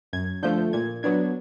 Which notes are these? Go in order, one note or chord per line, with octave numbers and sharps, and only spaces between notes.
F#2 G#6
D3 F3 A3 G6
A#2 G#6
F#3 B3 D4 G#6